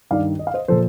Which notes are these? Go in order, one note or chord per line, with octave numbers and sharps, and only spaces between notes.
G2 D#3 D5 F5
D#5
F5
C5 D#5
A#2 F3 A4 C5